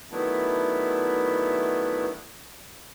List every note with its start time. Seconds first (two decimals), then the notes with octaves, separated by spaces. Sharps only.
0.11 D#3 F#3 A3 B3 D4 E4